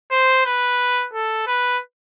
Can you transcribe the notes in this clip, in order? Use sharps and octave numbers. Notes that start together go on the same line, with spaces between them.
C5
B4
A4
B4